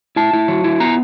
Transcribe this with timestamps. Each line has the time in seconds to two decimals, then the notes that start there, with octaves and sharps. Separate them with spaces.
0.16 E4 A5
0.33 E4
0.48 F#3
0.64 E4
0.80 B3 A#5